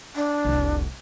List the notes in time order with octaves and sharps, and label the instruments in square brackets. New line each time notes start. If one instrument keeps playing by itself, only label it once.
[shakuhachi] D4
[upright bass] F1 C2